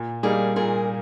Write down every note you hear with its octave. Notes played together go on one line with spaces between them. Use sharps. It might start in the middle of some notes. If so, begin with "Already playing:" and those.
Already playing: A#2
G3 A#3 D#4 G#4 A#4
A#2 G#4 A#4